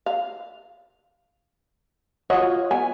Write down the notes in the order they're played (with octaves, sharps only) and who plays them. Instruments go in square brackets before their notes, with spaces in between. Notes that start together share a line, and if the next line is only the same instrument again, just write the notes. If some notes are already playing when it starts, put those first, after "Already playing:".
[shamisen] F5
[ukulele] F4 D#5 [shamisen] F#4 [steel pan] C#5 D#6
[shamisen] B3 [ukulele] G#5